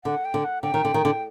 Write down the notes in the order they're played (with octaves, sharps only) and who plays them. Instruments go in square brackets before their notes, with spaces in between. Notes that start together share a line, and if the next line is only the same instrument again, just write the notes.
[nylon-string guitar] D3 [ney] F#5
[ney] G5
[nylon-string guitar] D3
[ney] F#5
[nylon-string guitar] D3 [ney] G5
[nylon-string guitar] D#3
D3
D#3
D3